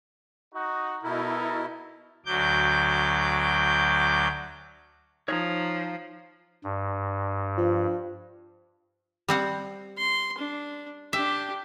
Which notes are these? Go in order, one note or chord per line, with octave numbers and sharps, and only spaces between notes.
D#4 F#4
B2 D#4 E4 A4 A#4
D2 F#3 D6 G6
F3 D#4 C#5 A#5
G2
F3
G3 C4 F#5
C6
D4
D4 G4 E5